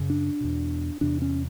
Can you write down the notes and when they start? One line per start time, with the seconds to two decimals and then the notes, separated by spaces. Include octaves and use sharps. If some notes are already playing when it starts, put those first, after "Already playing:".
Already playing: F#2 C#3
0.10 D4
0.41 E2 B2
1.01 E2 C3 D4
1.22 C#4